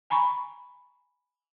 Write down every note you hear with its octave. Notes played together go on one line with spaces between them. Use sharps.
G#5 A#5 B5 C#6